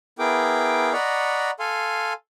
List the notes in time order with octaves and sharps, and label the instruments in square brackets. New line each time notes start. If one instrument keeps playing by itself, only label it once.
[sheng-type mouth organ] B3 E4 G#4 A#4 G5 D6
D5 D#5 F#5 A#5 B5 C#6
A4 F5 G#5 C6